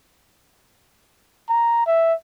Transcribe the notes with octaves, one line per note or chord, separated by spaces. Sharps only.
A#5
E5